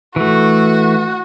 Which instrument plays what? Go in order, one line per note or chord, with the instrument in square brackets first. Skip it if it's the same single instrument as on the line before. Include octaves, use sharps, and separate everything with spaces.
[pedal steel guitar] E3 A3 [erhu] F#4